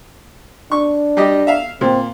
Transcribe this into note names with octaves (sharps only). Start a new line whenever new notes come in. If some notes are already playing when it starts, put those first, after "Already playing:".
D4 C#6
G3 G4 D#5
E5 F5
A#2 C4